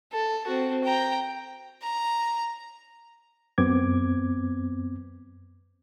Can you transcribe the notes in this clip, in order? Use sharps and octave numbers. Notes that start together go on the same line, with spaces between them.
A4
C4 F#4
G5 A#5
A#5
F#2 B3 C4 D6 G#6